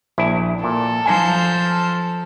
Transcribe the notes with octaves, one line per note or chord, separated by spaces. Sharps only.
A#1 E4
A#2 A4
F3 G#5 A#5 G6